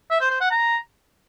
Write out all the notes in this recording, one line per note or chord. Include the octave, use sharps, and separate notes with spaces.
E5
C5
C5
F#5
A#5